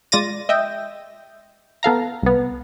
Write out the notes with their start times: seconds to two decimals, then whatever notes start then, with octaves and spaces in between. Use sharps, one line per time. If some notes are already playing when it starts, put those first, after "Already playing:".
0.12 G#3 F4 D5 A6 A#6 D#7
0.49 D#5 E5 G5
1.83 B3 A4 F5 A#5
2.22 C2 B3